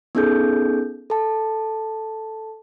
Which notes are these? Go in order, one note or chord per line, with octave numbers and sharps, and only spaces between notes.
B3 C#4 D#4 G#4 A4 G6
A4 A5